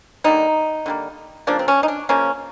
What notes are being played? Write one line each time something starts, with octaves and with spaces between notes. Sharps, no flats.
D3 G3 A#3 D#4
D3 G3 A#3
C#3 F3 A#3 D4
C4
C#4
D#4
D4
C#3 F3 A#3 C#4